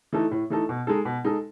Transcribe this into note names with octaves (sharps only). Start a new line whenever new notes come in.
E3 A3 D#4 A4
A2
E3 A3 D#4 A4
B2
G#3 D#4 A4
B2
G#3 D#4 A4